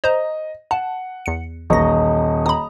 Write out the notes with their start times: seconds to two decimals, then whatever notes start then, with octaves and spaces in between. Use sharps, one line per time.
0.04 C5 D#5 A#5
0.71 F#5 A5
1.26 E2 C#7
1.70 D#1 A1 D#5 A#5 C#6 A#6
2.46 A#5 B5 D#6